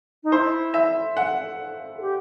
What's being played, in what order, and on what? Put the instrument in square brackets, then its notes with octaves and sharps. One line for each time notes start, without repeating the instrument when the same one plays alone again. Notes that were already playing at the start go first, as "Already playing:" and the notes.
[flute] D#4
[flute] E4 [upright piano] C5
[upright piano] E5
F#5
[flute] A4
G4